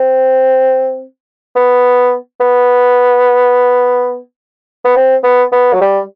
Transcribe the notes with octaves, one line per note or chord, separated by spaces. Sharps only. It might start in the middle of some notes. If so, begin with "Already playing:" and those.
Already playing: C4
B3
B3
B3
C4
B3
B3
F#3
G3